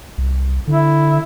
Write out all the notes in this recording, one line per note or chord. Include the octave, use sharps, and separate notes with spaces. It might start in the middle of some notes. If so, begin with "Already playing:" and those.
C2
D3 E4